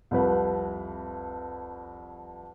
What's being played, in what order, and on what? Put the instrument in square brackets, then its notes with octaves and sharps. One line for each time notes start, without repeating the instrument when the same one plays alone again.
[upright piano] C2 F2 B4